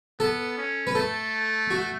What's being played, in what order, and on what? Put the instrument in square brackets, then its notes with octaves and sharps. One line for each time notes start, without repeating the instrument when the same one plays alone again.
[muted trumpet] B3 [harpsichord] A4
[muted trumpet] C#4
[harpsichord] B4
[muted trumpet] A3 [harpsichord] A4
[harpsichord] F#4